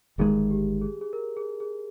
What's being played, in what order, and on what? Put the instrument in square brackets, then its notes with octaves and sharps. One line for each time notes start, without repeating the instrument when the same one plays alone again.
[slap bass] G1 G2 D#3 G#3 [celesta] G#4
[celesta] G4
G#4
G#4
A#4
G#4
G#4